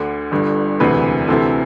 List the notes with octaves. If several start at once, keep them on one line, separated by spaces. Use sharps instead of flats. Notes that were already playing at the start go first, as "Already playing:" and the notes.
Already playing: D2 D3
G1 G2 D3
E1 D2 C3 E3 B4
D2 C3 E3 A4